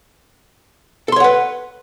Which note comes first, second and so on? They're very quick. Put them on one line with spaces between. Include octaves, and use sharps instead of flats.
A4 C6 C#5 F#5 B4